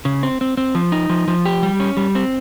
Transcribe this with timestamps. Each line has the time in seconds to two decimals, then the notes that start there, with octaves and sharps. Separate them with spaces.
0.05 C#3
0.23 C4
0.41 C4
0.57 C4
0.75 F3
0.92 D#4
1.10 F3
1.28 F3
1.45 G4
1.63 G3
1.80 C#4
1.97 G3
2.15 C4